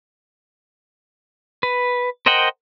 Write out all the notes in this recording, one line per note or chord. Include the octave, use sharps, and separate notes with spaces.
B4
A#4 C5 D#5 F#5 G5